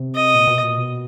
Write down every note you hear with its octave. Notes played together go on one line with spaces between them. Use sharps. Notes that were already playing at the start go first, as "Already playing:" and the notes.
Already playing: C3
D#5
A#2
B2
A#2
B2